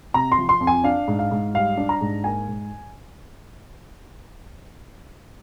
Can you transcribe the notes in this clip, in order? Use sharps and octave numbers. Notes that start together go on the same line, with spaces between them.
C3 A#5
C6
F3
C6
F2
G#5
D4 F5
G#2
F5
G#2
G3 F5
D4
A#5
G#2
A#3 G#5
G#2